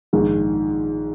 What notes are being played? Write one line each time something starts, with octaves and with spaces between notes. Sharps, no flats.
A#1 G#2 D#3